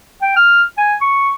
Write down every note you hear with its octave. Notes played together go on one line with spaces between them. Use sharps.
G5
F6
G#5
C#6